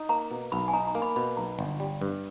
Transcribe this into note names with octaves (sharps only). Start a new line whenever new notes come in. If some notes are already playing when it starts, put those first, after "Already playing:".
Already playing: D#4
A#3 A#5
B2
B1 B5
G#5
D#4 A#5
A#5
A#3
B5
B2 B5
B1 A#5
G1
G3
G2